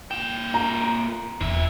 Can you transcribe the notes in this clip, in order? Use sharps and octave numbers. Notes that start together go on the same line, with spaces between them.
A#2 G5 E7
A#5
E1 D#3 E5